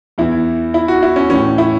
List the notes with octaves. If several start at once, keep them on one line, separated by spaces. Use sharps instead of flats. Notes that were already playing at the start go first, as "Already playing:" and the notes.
E2 E3 E4
E4
F#4
E4
C#4
A2 E3 C#4
E4